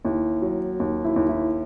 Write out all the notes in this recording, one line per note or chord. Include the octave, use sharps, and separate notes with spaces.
D#2 E4
F#3
D#2
E4
D#2
E4